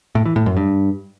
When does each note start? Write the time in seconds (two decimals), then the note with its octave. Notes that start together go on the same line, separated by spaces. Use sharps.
0.15 A2
0.26 E3
0.36 A2
0.46 F#2
0.57 G2